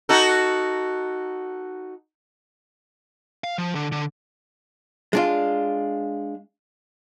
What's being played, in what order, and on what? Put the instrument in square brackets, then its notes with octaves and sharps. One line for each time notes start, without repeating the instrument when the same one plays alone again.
[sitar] D#4 F#4 A4
[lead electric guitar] F5
F3
D3
D3
[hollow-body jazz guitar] G#3 D4 F4